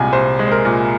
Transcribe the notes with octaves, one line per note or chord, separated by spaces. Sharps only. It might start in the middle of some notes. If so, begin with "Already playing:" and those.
Already playing: C2 A#2 G#3 G#5
C2 C5
G#3
C5
A#4
A#2